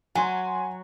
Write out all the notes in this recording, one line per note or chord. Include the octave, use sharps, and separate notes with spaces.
F#3 G#5 C6